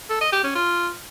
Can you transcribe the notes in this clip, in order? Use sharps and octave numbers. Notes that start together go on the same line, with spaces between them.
A4
D#5
G4
C#4
F4